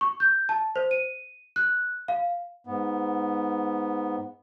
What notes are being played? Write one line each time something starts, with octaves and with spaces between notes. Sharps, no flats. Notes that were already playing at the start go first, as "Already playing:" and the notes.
C#6
G6
A5
C5
D#7
F#6
F5
G#2 B3